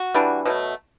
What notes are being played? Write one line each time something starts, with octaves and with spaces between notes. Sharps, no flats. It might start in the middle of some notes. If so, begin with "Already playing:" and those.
Already playing: F#4
E3 G3 D4
B2 F#3 A3